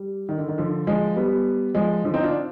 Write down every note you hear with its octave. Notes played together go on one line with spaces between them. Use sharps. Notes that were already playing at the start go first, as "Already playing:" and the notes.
Already playing: G3
D#3
D3
D#3
D3 F3
F3 G#3
G3 B3
F3 G#3
D3 F3
C4 D#4
D4 F4